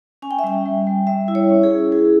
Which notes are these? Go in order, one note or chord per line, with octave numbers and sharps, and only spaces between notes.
C#4 G#5
G5
E5
G3 G5
G3
G3
G3 E5
E4
C#5
C#4
G#4
E4
E4 G#4